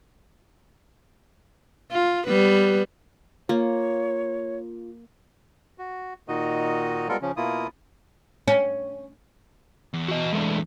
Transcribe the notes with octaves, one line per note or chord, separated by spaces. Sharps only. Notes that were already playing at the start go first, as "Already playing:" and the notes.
F4
G3 B3 B4
A#3 F4 C#5
F#4
A#2 D#3 D#4 F#4 D#5
G3 G#3 B3 F4 A4 A#4
C#3 F3 C#4
B2 A#3 E4 F4 D#6
C#4
E2
F#4 D#5
G#3 A3 D4